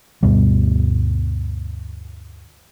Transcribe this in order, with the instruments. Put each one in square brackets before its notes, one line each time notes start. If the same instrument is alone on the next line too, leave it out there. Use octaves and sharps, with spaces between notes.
[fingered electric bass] D2 G2 B2 G3